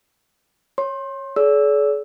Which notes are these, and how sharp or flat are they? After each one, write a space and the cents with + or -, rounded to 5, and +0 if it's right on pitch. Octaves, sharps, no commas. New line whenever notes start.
C#5 -10 C6 +25
G#4 +45 D5 -45 E6 -5